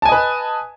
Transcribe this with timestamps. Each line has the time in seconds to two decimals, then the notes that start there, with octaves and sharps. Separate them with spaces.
0.02 A5
0.05 G#5
0.09 D#5
0.12 B4